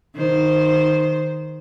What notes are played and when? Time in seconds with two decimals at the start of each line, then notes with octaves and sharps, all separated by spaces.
0.16 D#3 C5